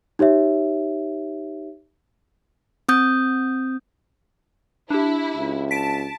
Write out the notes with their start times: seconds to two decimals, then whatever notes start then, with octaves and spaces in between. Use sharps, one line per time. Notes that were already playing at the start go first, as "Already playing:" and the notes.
0.19 D#4 G4 C#5 E5
2.89 C4 D#6 G6
4.90 D4 E4 G4
5.37 C#2
5.71 A5 B6 D7